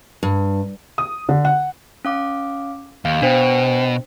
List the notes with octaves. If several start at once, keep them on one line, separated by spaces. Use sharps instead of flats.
G2
D#6
D3
F#5
C#4 F5 D6
D#2 F5
B2 D4 C5 G5